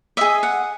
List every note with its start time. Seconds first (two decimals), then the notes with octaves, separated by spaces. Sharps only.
0.17 G#4 D#5 E5
0.43 F#5